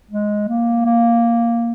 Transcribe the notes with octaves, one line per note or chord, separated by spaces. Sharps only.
G#3
A#3
A#3